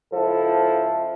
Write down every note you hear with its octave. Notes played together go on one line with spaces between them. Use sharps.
C#2 F3 E4 A4